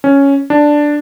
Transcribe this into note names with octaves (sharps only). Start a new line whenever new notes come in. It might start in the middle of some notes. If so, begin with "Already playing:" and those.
C#4
D4